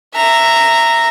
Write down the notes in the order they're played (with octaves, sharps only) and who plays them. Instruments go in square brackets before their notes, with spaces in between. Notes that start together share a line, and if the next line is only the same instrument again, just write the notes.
[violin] E5 A#5